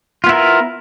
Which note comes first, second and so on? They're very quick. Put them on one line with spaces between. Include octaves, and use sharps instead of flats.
F4 B3 E4 A#4